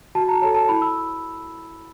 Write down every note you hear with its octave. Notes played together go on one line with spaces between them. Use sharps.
F#4 A5
A#5
A4 C#5 A5
A5
E4 B5
E6